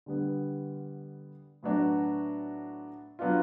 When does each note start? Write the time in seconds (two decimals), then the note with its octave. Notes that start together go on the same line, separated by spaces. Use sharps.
0.06 D3 G3 B3
1.63 A2 F#3 B3 D4 F#4
3.19 F#3 B3 D4 F4